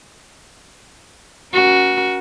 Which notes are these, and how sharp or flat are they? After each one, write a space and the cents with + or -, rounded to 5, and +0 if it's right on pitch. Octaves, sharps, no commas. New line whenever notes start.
C#4 +0 F#4 +0 A#4 +35